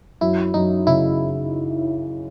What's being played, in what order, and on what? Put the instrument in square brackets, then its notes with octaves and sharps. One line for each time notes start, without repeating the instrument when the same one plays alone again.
[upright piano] F#2 [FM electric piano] E4
[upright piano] F#2 [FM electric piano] D#4
[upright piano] C#3 [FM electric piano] E4